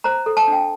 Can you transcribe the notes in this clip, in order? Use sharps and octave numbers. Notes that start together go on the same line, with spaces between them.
C5 A#5
A4
A5
D4 G5